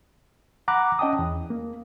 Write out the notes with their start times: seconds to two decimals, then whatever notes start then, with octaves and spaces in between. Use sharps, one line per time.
0.68 F#5 A#5 B5 D6 F#6
0.99 C#4 D#5 G5 A5 D#6
1.19 E2
1.50 A#3